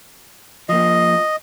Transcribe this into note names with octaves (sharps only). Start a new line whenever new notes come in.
F3 A#3 D#5